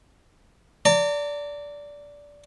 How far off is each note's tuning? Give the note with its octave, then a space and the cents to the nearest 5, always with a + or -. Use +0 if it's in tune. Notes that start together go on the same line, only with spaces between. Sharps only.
D5 -15 A#5 -40